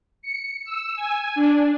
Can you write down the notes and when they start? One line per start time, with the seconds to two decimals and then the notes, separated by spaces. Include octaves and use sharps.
0.22 C#7
0.64 E6
0.96 G#5
1.35 D4